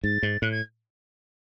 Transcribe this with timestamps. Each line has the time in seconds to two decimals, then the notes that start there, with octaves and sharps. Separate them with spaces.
0.03 G#2 A6
0.23 G#2
0.41 A2 F#6
0.51 G#6